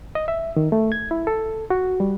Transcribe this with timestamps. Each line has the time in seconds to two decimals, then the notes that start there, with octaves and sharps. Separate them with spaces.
0.15 D#5
0.28 E5
0.56 D#3
0.72 A3
0.92 G#6
1.11 E4
1.27 A4
1.70 F#4
2.00 G3